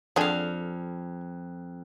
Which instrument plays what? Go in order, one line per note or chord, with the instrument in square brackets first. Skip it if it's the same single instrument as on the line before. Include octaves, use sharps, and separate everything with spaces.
[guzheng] F2 F5 [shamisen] D3 D4 G#4